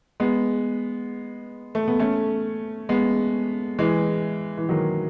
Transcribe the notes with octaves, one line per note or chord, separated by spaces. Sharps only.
G#3 B3
A3
B3
A3 C#4
G#3 B3
E3 G#3
E3
D#3 F#3